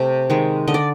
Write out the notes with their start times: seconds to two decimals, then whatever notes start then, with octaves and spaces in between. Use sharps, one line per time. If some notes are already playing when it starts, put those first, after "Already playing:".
Already playing: C3 A3
0.30 D#3 G#3
0.68 D3 D#5
0.74 D5